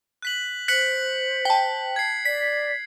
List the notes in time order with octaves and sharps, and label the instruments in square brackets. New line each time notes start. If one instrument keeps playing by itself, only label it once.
[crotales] F#6 B6 F#7
[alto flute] C5 [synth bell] F#6 [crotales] B6 C#7 F#7
[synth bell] G5 A5 [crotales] B6
[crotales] G#6 C7
[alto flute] D5 [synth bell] B6